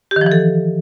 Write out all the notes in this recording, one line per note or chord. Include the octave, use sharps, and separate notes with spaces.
G4
D#3
F3
E3
A4